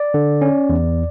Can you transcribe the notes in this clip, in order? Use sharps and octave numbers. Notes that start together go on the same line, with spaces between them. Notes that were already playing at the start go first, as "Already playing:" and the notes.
Already playing: D5
D3
C#4
E2